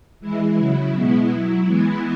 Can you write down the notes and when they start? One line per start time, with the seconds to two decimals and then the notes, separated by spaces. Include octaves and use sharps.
0.20 E3 G#3 E4
0.56 C#3 F#3 E4
0.93 B2 G#3 B3 E4
1.29 F#3 E4
1.66 E3 G#3 B3 E4